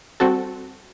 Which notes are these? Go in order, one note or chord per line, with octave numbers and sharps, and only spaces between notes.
G3 C4 F#4 A4